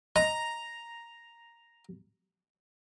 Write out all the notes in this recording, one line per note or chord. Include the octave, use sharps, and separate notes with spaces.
D#5 A#5